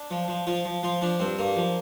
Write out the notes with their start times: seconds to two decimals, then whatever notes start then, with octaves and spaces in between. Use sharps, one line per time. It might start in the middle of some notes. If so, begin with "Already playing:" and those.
Already playing: D4
0.11 F3
0.28 F3
0.47 F3 F4
0.65 F3
0.83 F3 F4
1.02 F3 D4
1.20 G2 C4
1.39 G2 A#3
1.56 F3